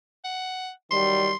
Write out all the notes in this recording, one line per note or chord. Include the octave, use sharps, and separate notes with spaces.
F#5
D#3 F#3 G3 C6